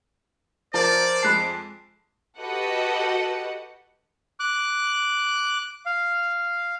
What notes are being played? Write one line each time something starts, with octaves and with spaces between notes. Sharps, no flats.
F3 A#4 C5 D5 A5
F2 G#3 A5 B5 F#6 C7
F#4 G4 A4 B4 D#5 F#5
D6 F#6
F5